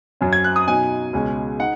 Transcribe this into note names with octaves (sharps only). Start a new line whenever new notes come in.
F#2 F#3 C#4
G#6
F#6
D#6
B2 F#3 D#4 G#5
C#2 B2 G#3 C#4
D#4 F#5